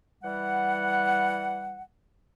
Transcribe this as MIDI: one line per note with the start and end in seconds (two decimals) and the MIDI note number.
0.23 1.83 52
0.23 1.83 55
0.23 1.83 78